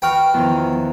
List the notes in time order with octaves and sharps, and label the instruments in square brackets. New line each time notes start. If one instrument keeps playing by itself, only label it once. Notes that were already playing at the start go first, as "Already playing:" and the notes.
[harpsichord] F#4 G5 [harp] B4 C#6 F6
[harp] E2 D#3 F3